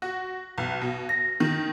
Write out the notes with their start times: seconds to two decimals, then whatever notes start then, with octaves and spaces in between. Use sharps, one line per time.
0.02 F#4
0.58 B1
0.81 B2
1.09 A#6
1.40 D#3